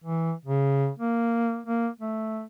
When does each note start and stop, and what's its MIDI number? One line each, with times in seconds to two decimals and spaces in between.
0.04 0.33 52
0.45 0.90 49
0.99 1.61 58
1.67 1.88 58
2.00 2.43 57